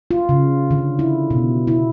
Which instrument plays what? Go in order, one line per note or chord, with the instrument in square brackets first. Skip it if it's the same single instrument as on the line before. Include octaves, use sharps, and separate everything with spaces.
[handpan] F4
C#3
D3
E4
B2
E4